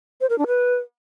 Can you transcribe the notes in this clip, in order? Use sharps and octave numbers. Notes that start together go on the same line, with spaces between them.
C5
A#4
D4
B4